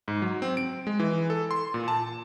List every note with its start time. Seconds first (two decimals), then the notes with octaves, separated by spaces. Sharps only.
0.08 G#2
0.22 F#3
0.42 C4
0.57 D7
0.87 G#3
1.00 E3
1.30 A4
1.51 C6
1.74 A#2
1.88 A5